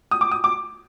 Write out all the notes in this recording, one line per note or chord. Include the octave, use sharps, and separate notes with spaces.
D#6
D6
D#6
D6